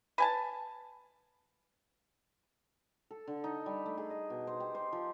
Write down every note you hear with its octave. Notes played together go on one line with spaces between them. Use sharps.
B4 G#5 A5
A4
D3
D#4
G3
A3
G#4
D#5
B2
C5
G4
C5
F3